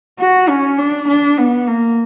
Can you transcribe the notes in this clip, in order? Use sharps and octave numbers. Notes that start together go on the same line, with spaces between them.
F#4
C#4
D4
D4
B3
A#3